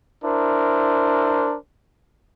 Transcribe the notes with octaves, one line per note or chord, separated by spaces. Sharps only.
D4 E4 A#4 C5